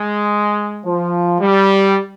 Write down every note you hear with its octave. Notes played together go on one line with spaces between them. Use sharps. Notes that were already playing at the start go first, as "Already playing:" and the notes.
Already playing: G#3
F3
G3